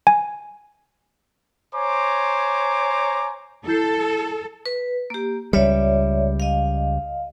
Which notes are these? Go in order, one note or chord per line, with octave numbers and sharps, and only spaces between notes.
G#5
C5 C#5 G#5 A#5 D6
E4 A4 G6 C7
B4
A#3 G4
C#2 G3 C#5 D5 E5
D#5 F5